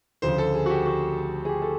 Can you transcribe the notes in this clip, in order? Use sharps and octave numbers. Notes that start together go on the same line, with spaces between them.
D2 C#3 F3 C5
A4
G#4
F#4
G4
F#4
G#4
G4
A4